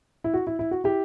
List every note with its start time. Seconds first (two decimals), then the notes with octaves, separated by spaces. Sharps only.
0.24 E4
0.34 F#4
0.47 E4
0.59 E4
0.71 F#4
0.84 E4 G4